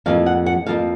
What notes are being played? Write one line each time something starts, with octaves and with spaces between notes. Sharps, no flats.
F2 F3 A#3 F5
F#5
F#5
F2 F3 A#3 F5